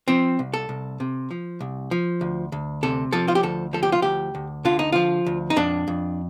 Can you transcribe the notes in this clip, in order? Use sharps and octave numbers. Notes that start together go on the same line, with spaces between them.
F3 C4
C2
A4
C2
C3
F3
C2
F3
D2
D2
C3 A4
F3 A4
F4
G4
D2 A4
F3 A4
G4
F4
D2 G4
D2
D3 F4
D#4
F3 F4
D2
D#4
F2 D4
F2